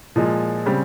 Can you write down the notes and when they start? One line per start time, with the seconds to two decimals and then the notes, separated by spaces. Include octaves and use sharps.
0.16 A#2 F3 G#3
0.66 C#3 G3 C4 G4